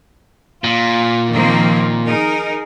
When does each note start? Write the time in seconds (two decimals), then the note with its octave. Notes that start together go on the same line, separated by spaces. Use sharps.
0.64 A#2 F4
1.32 D#3 F3 A#3 C4
2.06 D#4 G#4 A#4